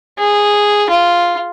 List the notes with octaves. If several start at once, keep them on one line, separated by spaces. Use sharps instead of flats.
G#4
F4